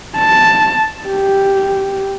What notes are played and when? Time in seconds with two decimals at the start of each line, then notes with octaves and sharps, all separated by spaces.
0.17 A5
1.07 G4